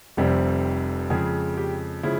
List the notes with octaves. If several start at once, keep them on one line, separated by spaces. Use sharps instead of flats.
F1 F2 C3 G3
F2 C#3 F3 G#3 G#4
G4
C#3 F3 G#3 E4